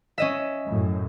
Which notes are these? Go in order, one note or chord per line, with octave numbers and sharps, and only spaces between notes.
C#4 D#5 E5
F#2 A2